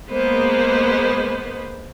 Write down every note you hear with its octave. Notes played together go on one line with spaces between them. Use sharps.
G#3 A#3 B3 B4 C5